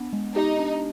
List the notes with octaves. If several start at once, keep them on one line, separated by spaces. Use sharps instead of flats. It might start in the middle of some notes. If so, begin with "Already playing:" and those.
Already playing: B3 D4
G#3
D#4 G4
D4